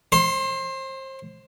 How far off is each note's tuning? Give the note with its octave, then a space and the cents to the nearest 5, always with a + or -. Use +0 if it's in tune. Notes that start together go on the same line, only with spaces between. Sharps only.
C5 +30 C6 -10